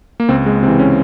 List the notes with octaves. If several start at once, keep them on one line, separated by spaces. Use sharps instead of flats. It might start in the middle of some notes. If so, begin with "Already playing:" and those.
A#3
C#2 C4
G#3
C3 E3 C4
C#4